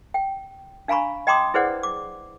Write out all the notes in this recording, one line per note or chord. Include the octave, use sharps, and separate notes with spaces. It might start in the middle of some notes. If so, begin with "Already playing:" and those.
G5
D4 F5 G#5 A#5 B5 C#6
D#5 G5 A#5 C6 D6 D#6
E4 G#4 B4 C5 D5 F#5
D6